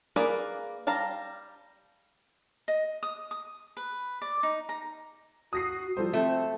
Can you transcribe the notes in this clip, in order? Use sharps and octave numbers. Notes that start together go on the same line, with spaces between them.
A#3 G#4 A#4 B4 D5
G3 F5 A5 A#5
D#5
D#6
D#6
B4
D5
D#4
A#5
F#4 D#6 A#6 C7
F3 G3 A4 C5
A3 C4